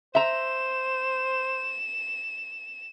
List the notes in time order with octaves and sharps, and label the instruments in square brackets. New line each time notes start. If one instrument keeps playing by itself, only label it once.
[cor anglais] C5 [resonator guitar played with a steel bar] E5 A#5 [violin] E7